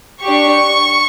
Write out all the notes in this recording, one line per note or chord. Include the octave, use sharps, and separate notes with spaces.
D4 G4 C#6